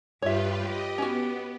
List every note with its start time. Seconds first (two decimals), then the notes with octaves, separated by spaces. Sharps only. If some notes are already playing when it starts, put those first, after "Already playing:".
0.22 G2 F4 G4 B4 C#5 E5
0.67 G4 D#5
0.98 B3 C#4 F#4